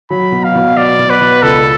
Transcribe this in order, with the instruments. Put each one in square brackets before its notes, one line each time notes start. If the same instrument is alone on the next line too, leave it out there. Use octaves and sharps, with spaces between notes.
[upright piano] F#3 [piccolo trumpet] B5
[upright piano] B2
[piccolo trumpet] F5
[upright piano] B2
[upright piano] F#3 [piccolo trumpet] D5
[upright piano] B2
[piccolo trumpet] B4
[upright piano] B2
[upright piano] C#2 [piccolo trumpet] A4